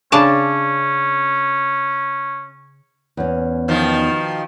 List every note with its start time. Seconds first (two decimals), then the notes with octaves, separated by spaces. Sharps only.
0.12 C#3 C#4 D4 A5
3.17 E2 C#4
3.68 B2 D#3 F3